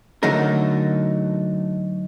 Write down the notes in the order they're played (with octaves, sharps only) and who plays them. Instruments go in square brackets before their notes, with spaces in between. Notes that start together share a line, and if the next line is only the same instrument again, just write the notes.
[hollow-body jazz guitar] D3 F#3 A3 D#4 A#4